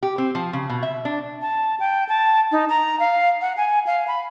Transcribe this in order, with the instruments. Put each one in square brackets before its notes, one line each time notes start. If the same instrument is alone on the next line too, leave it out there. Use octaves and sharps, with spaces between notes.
[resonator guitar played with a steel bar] G4
C4
F3
C#3
B2
E5
D4
[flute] A5
G5
A5
D#4
A#5
F5
F#5
G#5
F5
B5